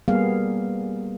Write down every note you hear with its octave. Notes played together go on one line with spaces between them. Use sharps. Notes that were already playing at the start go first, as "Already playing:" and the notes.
G3 A#3 B3 G#4 F5